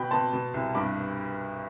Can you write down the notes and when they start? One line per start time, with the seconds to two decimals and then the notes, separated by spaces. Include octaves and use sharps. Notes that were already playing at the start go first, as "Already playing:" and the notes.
Already playing: B2 G5 B5
0.11 B2 A5 C6
0.33 B2
0.54 C2
0.74 G2 B5 D6